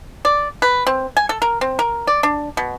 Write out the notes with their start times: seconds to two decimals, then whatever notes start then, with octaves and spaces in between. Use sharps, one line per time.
0.25 D5
0.62 B4
0.87 C4
1.17 G#5
1.29 A4
1.42 A#4
1.61 C4
1.79 A#4
2.07 D5
2.23 D4
2.57 B2